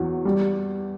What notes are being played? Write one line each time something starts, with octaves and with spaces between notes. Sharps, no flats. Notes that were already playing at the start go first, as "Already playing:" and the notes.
Already playing: E2 F#3
G3